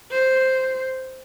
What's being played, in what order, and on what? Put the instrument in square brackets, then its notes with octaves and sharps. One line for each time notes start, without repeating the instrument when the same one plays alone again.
[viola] C5